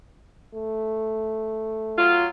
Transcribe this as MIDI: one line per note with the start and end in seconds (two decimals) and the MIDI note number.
0.54 2.29 57
1.98 2.27 54
1.98 2.27 65